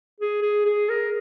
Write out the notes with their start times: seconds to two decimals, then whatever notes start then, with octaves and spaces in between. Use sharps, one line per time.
0.20 G#4
0.42 G#4
0.65 G#4
0.89 A#4